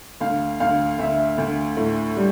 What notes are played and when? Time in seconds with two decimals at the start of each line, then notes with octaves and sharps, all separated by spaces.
0.20 D2 F5
0.60 D2 F5
0.98 D2 E5
1.38 D2
1.77 A2
2.17 G3